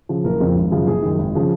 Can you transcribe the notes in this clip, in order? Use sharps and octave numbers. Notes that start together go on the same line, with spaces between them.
C#3 F3
F#1 A#4
F2 C#3 F3
G#1
F#2 C#3 F3
F#1 G#4
F#2 D#3
G#1
C#3 F3